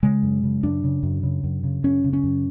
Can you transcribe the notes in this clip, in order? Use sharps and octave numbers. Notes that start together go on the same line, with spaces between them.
C#3 G#3
F#2
C#3
F#2 D4
C#3
F#2
C#3
F#2
C#3
F#2 C#4
C#3
C#4
F#2